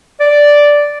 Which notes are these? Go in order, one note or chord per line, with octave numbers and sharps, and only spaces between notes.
D5